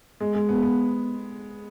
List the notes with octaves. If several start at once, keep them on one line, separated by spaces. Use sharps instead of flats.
G#3
G#3
B3
B3